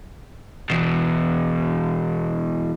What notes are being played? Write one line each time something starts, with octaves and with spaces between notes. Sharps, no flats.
E2 B2